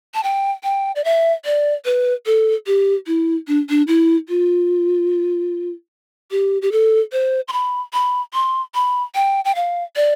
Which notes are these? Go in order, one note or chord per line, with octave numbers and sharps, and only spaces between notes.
A5
G5
G5
D5
E5
D5
B4
A4
G4
E4
D4
D4
E4
F4
G4
G4
A4
C5
C6
B5
B5
C6
B5
G5
G5
F5
D5